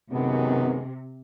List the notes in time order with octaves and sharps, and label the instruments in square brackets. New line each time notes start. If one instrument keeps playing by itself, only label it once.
[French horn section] F#2 D#3 G#3 B3 [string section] C3